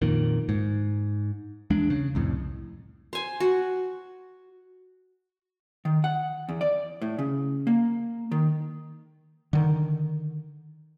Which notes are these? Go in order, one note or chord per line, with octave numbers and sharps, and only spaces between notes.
F2 A#2 D#3
G#2
E2 G#3 D4
C#3
C2 F2 A2
C5 G#5
F#4
D#3
F#5
E2
D5
A2
C#3
A#3
D#3
D3 D#3